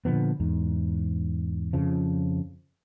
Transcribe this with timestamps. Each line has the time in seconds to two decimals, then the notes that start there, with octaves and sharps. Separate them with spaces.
0.05 A#2 D3 F3 B3
0.40 E2 G#2
1.73 F2 C#3 F3